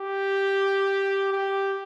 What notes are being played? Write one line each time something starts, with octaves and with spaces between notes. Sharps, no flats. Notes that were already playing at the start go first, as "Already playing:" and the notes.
Already playing: G4
G4